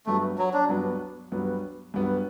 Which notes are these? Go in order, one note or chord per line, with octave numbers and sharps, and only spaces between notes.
G2 F#3 A3 B3
F#3
D4
G2 F#3 B3
G2 F#3 B3
G2 F#3 B3